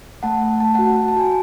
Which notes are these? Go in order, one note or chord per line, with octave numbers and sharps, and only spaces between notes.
A3 F#5 A5
A3
A3 A5
F#4 F#5 A5
F#4
A5
F#4 G#5